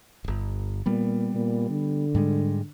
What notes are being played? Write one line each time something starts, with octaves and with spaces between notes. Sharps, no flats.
D1 G1
A#2 G3 B3
A#2
D3
G#2 G3 G#3